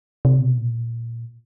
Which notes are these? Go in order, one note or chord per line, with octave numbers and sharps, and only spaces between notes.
C3
B2
A#2